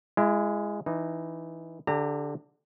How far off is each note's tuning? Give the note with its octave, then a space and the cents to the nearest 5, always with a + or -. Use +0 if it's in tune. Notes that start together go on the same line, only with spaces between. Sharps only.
G#3 -5 E4 +30
E3 +0 D#4 -15
D3 +0 G4 +30 A#5 -30